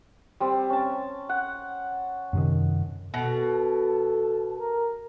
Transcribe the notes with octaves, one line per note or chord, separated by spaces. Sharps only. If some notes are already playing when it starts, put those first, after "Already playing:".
G3 C4
C#4 A5
F#5
F#2 C3 D#3
B2 A4
A#4